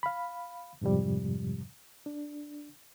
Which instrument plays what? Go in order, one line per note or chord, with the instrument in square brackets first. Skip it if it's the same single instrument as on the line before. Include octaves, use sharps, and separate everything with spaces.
[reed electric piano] F5 B5
F2 G#2 C3 F3 G3
D4